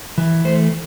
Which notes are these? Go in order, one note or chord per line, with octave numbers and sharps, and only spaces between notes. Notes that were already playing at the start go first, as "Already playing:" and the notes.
E3
A3 C5